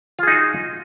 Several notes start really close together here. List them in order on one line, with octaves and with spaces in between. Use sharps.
F4 G#4 D#4 F#4